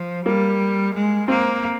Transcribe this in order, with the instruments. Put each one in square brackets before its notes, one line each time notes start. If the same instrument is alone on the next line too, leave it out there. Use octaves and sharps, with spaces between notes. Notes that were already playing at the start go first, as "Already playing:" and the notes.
Already playing: [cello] F3
[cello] G3 [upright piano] A#3
[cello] G#3
[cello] A#3 [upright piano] C4